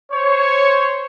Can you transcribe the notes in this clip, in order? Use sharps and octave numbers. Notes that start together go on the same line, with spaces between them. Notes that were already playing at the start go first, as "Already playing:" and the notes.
C5 C#5